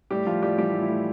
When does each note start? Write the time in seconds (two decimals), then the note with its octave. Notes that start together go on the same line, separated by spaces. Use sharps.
0.10 A2 G3 G4
0.27 A2 F3 F4
0.42 A2 G3 G4
0.58 E3 G3 G4
0.74 A2
0.82 E4
0.89 A2